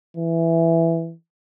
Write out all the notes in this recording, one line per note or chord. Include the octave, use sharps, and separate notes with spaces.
E3